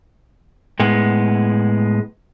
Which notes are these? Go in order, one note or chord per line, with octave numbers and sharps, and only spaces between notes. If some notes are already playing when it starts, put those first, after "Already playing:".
A2 G#3 B3